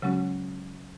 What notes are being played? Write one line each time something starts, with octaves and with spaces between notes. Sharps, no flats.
C#3 F#3 G#3 C#4 F#4